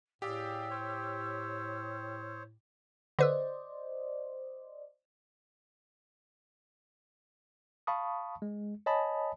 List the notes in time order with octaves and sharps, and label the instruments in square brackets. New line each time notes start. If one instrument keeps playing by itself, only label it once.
[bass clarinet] A2 [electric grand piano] G4 G5 [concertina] G#4 D5 F5 [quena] E6
[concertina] C5 C#5
[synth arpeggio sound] D3 B4 E6 [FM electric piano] C5 D5 D#5
[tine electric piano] F5 A5 B5 C#6 D#6
G#3
C#5 D#5 G#5 A5 B5 D#6